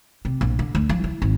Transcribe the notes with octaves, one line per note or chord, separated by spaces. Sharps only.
C3
A#1
D3
D2
F3
E4
G#1